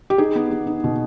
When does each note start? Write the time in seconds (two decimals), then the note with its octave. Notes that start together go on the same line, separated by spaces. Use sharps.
0.10 G4
0.18 D#4 G#4
0.36 B3
0.51 B3
0.67 D#4
0.84 B2